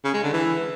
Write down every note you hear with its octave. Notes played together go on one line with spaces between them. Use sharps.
C#3
G#3
D3
E3